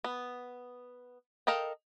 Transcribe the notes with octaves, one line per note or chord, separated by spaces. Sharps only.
B3
A4 A#4 D#5 F5 G5